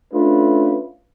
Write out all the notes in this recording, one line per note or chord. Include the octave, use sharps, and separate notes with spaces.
A3 C#4 D4 F4 B4